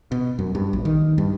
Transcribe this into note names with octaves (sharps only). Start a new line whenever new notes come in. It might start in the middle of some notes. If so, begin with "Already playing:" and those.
B2
F#2
G2
A#1
D#3
G2